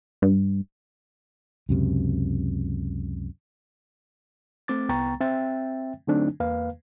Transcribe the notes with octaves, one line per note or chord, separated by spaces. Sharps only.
G2
C#2 F#2 C3
A3 C4 D6 A6
C2 B3 G5 A#5 C#6 A6
C4 E5 G5 A6
D3 F#3 A3 C4 D4 D#4
E2 A#3 B4 F5